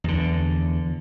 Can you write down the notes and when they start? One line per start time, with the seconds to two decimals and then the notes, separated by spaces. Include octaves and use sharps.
0.04 E2 D3